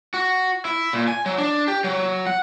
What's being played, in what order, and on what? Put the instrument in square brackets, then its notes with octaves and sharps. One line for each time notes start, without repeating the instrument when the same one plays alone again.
[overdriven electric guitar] F#4
E4
A#2
G#5
F#3
D4
G4
F#3
F#5